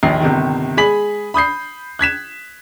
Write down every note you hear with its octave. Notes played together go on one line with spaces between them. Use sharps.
A#1 D#2 C7
G1 C3 D#3
G#3 G#4 G#5 B5 B6 F#7
B5 D#6 G6 C7
F#6 G#6 B6 E7